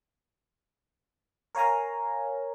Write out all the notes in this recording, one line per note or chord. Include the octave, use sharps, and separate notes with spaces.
A#4 C#5 F5 G#5 A#5